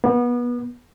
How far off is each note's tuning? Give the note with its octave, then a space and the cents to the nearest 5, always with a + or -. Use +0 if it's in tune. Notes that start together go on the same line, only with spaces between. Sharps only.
B3 -25